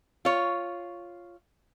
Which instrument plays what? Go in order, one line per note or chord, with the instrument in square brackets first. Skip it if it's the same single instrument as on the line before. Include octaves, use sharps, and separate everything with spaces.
[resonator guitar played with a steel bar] F4 C#5